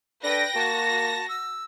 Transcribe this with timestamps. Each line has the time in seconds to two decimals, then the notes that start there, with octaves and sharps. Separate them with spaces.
0.23 D4 A4 B4 G5 A#6
0.55 A#3 F#4 A5
1.29 E6